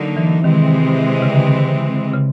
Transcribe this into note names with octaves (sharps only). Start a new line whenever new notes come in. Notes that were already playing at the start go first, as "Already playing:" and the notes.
Already playing: D3 F#3 A#3 D#4
E3
C3 D#3 E3 G#3 C4
C#3
D3
C#3